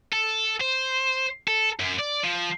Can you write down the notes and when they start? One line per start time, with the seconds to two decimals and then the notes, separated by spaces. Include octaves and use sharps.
0.13 A4
0.61 C5
1.48 A4
1.80 F#2
1.99 D5
2.24 F3